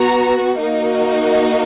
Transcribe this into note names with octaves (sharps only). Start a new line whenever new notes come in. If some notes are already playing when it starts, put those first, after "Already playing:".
Already playing: B3 F#4 A#5
A#3 D#4 F#4